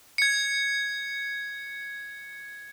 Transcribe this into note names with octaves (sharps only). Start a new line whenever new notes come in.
G#6 C#7